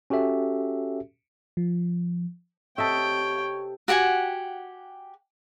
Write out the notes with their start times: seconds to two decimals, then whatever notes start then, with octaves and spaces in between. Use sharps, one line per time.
0.10 C#4 F#4 G4 A4 E5
1.57 F3
2.78 C3 A4 C#5 D#5 E5 G5
3.88 F#4 G4 F#5 G#5